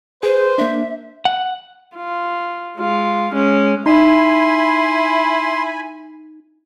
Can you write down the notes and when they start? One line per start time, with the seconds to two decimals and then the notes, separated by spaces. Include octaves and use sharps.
0.23 G#4 B4 C5
0.58 A#3 D4 E5
1.25 F#5
1.96 F4
2.78 G#3 F4
3.32 G#3 C#4
3.86 D#4 E4 G#5 B5 C6